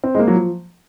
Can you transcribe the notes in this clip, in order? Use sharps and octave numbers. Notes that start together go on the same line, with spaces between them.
C4
G#3
A#3
F#3
F3